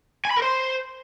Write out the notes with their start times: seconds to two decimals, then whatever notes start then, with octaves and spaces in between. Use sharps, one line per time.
0.25 G#5
0.31 B5
0.36 A#4
0.42 C5